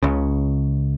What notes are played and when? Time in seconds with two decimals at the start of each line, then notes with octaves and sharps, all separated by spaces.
0.03 C#2 C#3